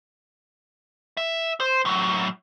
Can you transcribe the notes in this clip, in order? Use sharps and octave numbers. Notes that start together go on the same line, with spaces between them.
E5
C5
A2 F#3